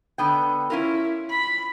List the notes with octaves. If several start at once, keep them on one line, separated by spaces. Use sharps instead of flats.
D3 B3 G5
C#4 E4 F4 A#4
B5